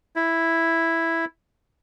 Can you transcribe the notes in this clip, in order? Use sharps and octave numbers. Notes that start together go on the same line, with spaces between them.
E4